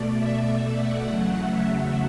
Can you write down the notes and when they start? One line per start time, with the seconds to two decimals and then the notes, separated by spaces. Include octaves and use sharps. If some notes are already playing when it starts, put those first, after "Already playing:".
Already playing: B2 A3 D5
0.12 E5
0.75 F#5
1.06 E2 C#3 F#3 A3
1.39 E5
1.70 F#5